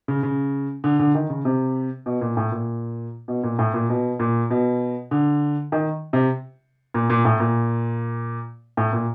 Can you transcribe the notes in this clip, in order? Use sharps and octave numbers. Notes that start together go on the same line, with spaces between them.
C#3
C#3
D3
D3
D#3
C#3
C3
B2
A#2
A2
A#2
B2
A#2
A2
A#2
B2
A#2
B2
D3
D#3
C3
A#2
A#2
A2
A#2
A2
A#2